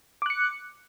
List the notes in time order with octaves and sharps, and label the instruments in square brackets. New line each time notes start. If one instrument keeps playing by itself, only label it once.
[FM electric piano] D6
F#6
C#7